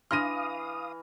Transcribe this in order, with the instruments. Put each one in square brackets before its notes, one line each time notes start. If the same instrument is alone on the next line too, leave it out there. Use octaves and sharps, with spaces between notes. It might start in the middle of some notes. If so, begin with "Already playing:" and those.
[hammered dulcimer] E3 [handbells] D4 C6 [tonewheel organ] F5 D#6 [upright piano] F6 A#6 D#7